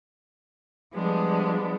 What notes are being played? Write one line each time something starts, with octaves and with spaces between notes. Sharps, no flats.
F3 G3 G#3 B3 D4